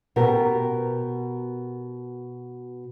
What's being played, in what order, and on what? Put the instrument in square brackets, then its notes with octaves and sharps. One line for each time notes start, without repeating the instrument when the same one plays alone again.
[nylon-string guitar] B2 G4 A#4